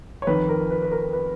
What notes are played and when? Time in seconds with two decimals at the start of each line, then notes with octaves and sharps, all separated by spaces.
0.22 C#5
0.27 F2 D#3 B4
0.49 A#4
0.70 B4
0.82 B4
0.92 A#4
1.13 B4